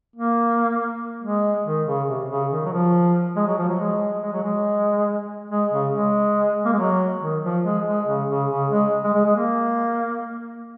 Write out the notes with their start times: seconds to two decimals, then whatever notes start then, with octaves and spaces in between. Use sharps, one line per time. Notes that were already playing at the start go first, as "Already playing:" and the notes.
0.16 A#3
1.22 G#3
1.66 D#3
1.86 C#3
2.08 C3
2.29 C#3
2.51 D#3
2.65 F#3
2.72 F3
3.36 G#3
3.47 F#3
3.58 F3
3.69 F#3
3.79 G#3
4.23 G#3
4.32 F#3
4.43 G#3
5.50 G#3
5.72 C#3
5.93 G#3
6.65 A#3
6.72 G#3
6.78 F#3
7.22 D#3
7.43 F3
7.64 G#3
7.86 G#3
8.07 C#3
8.29 C#3
8.50 C#3
8.71 G#3
9.04 G#3
9.14 G#3
9.25 G#3
9.35 A#3